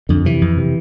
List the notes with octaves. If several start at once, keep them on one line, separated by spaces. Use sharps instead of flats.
F2 D3
C3 E3
F2
C3